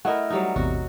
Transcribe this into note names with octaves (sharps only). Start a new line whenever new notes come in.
A3 E4 A#4 D#5 F#5
F#3 G3 D#4
A1 E2 C3 F#4